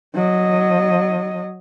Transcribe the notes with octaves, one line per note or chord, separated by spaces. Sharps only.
F#3 D#5